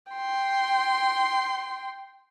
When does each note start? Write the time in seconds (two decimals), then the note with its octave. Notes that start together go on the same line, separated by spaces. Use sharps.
0.12 G5 C6